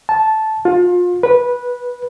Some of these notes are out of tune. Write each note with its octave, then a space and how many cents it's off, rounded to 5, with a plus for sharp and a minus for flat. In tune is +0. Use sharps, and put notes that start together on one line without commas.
A5 -10
F4 +30
B4 -15